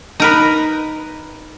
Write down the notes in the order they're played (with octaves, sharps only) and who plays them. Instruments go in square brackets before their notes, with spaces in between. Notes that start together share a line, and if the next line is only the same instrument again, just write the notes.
[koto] D#4 A#4 B4